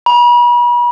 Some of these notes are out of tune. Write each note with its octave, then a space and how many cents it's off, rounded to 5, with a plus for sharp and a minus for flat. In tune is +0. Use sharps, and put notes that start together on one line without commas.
B5 -40